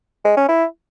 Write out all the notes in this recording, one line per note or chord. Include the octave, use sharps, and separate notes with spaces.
G#3
C#4
E4